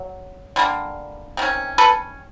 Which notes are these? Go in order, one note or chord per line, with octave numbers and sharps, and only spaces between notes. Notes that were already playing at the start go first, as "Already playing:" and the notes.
Already playing: F#3
D3 G3 A#3
C3 D#3 C#4
A4 B4